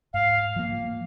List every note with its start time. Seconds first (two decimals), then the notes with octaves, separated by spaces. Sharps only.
0.13 G#2 F5
0.56 F3 A#3